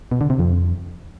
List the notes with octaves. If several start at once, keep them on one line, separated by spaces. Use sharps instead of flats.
B2
D3
C3
F2